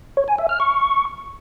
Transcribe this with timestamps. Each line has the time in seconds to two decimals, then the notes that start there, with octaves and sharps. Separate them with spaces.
0.17 C#5
0.28 G#5
0.38 E5
0.49 F6
0.60 C#6